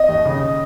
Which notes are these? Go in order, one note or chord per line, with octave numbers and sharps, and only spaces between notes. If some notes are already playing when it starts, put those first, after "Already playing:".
Already playing: D#5
D#2
C#3